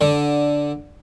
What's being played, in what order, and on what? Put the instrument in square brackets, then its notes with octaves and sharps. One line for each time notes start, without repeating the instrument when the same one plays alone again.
[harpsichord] D3